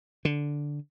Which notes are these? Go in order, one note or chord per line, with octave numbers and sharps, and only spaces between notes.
D3